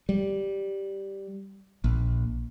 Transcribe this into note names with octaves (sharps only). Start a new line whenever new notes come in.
G3
A#1